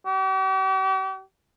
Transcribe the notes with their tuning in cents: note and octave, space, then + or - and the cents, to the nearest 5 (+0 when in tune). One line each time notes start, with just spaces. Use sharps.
G4 -45